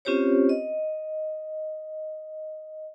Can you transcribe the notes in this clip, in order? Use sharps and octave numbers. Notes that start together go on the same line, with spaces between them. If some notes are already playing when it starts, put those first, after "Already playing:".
C4 C#4 F4 G4 C5 C#5
D#5